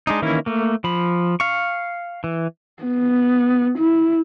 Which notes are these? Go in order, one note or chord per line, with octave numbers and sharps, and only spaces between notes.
G#3 D4 D#4
D#3 E3 A#3 C#4 E4
A3 A#3
F3 B5
F5 C#6
E3
B3
E4